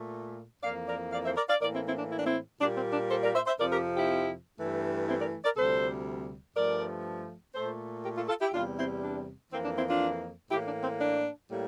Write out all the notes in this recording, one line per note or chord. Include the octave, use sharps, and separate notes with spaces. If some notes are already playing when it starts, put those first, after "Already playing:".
Already playing: A#2 A3
F2 E3 A#3 D5 F5
A#4 D5
D5 F5
C5 E5
A#4 D5
D5 F5
A2 E3 A#3 A#4 D5
C4 E4
C4 E4
D4
E4
D4
C4 E4
A#2 G3 A#3 D4
C4
D4
A4 C5
A#4 D5
C5 E5
C5 E5
F2 C3 F3 A#4 D5
G4 A#4
E4 G4
G2 E3 A3
C4 E4
A#4 D5
A#4 D5
D2 C3 G3 A4 C5
G2 F3 A3 A#4 D5
A#2 A3 A4 C5
G4 A#4
F4 A4
F4 A4
E4 G4
E2 C3 G3 D4 F4
C4 E4
D4
F2 E3 A#3 C4
D4
C4 E4
D4 F4
A2 E3 A#3 E4 G4
D4
C4
D4
A2 G3 A#3